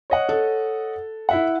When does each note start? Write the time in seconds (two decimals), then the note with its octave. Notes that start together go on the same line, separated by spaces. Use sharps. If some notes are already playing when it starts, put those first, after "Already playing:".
0.10 C#5 D#5 F#5
0.29 A4
1.29 E4 E5 F#5